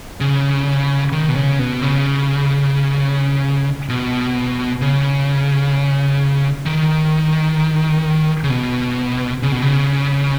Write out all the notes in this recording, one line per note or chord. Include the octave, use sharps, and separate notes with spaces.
C#3
D#3
B2
C#3
B2
C#3
B2
C#3
D#3
C#3
B2
C#3
B2
C#3